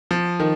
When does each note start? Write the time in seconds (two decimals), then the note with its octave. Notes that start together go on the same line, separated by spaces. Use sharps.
0.11 F3
0.40 D#3